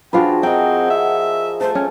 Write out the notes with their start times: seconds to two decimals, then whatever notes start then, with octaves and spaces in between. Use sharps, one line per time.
0.13 F3 D4 F4 F#4 G#4 B4 G5
0.43 C4 A#4 D#5 F#5 G5
0.90 E5
1.61 A3 A4 C5
1.75 C#4 G#5